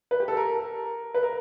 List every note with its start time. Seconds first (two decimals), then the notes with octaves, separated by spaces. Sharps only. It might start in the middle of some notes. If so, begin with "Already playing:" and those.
0.11 B4
0.20 G4
0.28 A4
0.37 A#4
1.14 B4
1.23 A#4